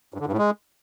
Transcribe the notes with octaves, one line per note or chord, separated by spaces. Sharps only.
G2
D3
G2
A2
G#3